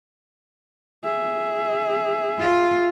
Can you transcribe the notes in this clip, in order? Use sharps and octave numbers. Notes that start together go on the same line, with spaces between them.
G#4 E5
F4